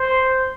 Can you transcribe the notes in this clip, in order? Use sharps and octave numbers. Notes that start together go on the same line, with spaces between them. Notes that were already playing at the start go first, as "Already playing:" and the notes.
Already playing: C5